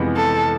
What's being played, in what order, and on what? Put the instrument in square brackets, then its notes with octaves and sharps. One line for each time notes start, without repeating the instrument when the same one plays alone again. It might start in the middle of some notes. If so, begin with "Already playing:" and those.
Already playing: [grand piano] F2 C3 E3 G#3 B3
[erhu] A4